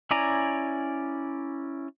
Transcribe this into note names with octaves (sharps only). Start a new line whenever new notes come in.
C#4 E4 D5 G#5 A#5